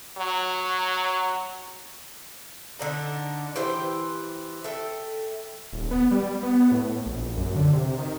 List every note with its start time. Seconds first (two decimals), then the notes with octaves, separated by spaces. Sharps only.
0.18 F#3
2.79 D3 D4 D#4
3.56 E3 G4 C5 G5
4.64 A4 E5 G5
5.73 D#1
5.91 B3
6.11 G3
6.43 B3
6.72 A2
7.06 A#1
7.37 F#2
7.56 D3
7.73 C3
7.98 D#3